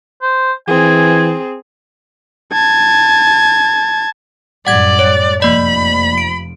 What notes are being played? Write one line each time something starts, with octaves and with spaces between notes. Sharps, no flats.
C5
E3 C4 G#4 G#5
A5 G#6
F#2 A2 G3 D5 F#5 G#6
C#5
F1 F3 A#3 D5 B5
D7